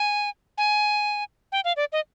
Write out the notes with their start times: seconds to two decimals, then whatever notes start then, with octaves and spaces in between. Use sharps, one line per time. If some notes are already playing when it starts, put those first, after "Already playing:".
Already playing: G#5
0.58 G#5
1.52 G5
1.64 F5
1.76 D5
1.92 D#5